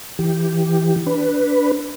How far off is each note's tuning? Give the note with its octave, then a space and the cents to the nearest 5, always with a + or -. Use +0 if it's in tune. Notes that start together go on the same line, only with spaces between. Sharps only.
E3 +0 G4 +0
D4 -15 B4 +0